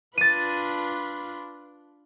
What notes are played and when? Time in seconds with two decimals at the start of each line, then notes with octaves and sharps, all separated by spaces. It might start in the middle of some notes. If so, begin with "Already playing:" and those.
0.18 D4 F4 B4 A6 D#7